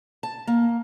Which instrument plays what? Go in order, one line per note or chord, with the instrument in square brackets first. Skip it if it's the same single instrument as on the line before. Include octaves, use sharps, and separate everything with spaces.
[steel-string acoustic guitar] A5
A#3